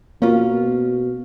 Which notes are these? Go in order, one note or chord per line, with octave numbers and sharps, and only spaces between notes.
B2 A#3 C#4 F4